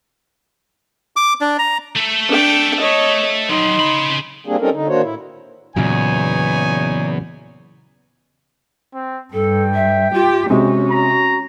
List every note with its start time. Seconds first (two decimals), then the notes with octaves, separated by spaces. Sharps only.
1.16 D6
1.41 D4
1.59 A#5
1.96 A3 A4
2.28 D4 G5
2.80 C#5 D#5
3.49 F#3 G3 D#4 C6
3.79 C#3 B5
4.47 G3 A#3 C4 D4 G#4
4.60 G3 C4 C#4 D#4 A4 A#4
4.73 D3 D#4
4.88 D#3 A#3 D4 F#4 C5 C#5
5.02 A2 E4
5.76 E2 A#2 C#3 F#3 D#4 C#5 G#5
8.94 C4
9.34 G2 A4 G5
9.74 E5
10.14 F4 G4
10.50 C3 G#3 C#4 F#4
10.91 A#5